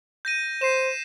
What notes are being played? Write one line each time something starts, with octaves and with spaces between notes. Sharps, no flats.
G6 A#6 D#7
C5 C7 E7